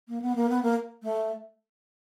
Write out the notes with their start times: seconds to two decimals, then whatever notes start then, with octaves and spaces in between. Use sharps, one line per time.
0.08 A#3
0.22 B3
0.36 A#3
0.50 B3
0.63 A#3
1.03 A3